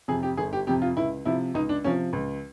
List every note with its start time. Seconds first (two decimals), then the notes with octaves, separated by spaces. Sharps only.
0.08 F2 C3 G#4
0.23 G4
0.37 G1 G#4
0.53 G4
0.67 F2 C3 G4
0.82 F4
0.97 C#2 E4
1.25 C3 F3 E4
1.54 C#2 D#4
1.69 D4
1.84 C3 F3 C#4
2.13 C#2